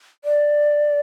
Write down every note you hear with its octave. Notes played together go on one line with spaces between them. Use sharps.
D5